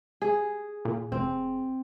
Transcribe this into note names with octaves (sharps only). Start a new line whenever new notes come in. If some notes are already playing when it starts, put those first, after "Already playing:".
G#4
A#2
F1 C4